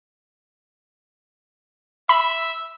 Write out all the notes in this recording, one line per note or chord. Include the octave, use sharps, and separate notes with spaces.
E5 B5